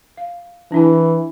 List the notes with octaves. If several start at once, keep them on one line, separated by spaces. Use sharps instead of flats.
F5
E3 D4 E4 A5